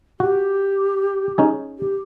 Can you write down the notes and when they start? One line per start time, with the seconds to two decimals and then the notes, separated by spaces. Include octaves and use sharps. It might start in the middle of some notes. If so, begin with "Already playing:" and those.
0.20 F#4 G4
1.38 C#4 D#4 G#4
1.78 G4